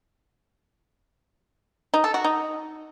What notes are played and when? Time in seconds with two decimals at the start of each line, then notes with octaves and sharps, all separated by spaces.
1.94 D#4
2.04 A4
2.14 F#4
2.24 D#4